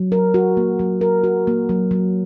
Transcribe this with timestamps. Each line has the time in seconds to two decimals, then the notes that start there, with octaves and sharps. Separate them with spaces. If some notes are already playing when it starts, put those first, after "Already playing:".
Already playing: F#3
0.12 A#4
0.34 F#4
0.57 A#3
0.79 F#3
1.01 A#4
1.24 F#4
1.47 A#3
1.69 F#3
1.91 F#3